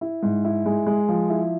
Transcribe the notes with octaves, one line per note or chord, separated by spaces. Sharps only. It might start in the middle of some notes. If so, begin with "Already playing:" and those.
E4
G#2
E4
G#3
G#3
F3
E4